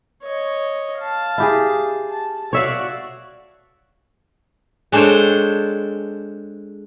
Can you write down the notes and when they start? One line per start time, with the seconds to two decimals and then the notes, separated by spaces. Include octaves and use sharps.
0.23 C#5 D#5
0.99 F5 A5
1.38 E4 G4 G#4
2.10 A5
2.53 F#4 C#5 D5 E5 F5
4.92 G#3 D4 A4 C5 C#5 G5